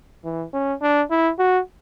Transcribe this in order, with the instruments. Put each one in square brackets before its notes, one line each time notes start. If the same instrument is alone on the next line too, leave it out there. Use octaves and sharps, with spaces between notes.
[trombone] E3
C#4
D4
E4
F#4